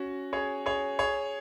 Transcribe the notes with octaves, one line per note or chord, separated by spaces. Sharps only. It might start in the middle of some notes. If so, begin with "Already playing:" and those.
Already playing: C#4 F#4
G#4 C#5
G#4 C#5
G#4 C#5